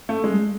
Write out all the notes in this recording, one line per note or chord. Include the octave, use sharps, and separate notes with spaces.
A3
G3 G#3
G#3